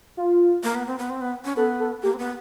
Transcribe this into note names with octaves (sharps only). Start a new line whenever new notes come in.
F4
A#3
B3
C4
B3
C4
B3
C#4
B3 A4
A4
A#3 G4
C4
B3